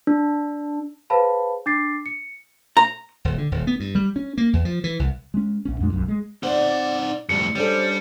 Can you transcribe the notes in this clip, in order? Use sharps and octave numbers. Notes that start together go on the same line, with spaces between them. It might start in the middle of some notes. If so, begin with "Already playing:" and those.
D4
G#4 B4 C5 F5 A5 B5
D4 D6 A6 C7
C#7
A#5
D#1
D3
D#1
B3
G2
G3
C#4
A#3
E2
F3
E3
C2
G#3 C#4
A#1 C#4
F2 A#2 G#3 D4
D1 B1 F#2
G#3
C4 D#4 D5 F#5
F2 A2 G3 C#7
G3 C#4 D4 A4 C5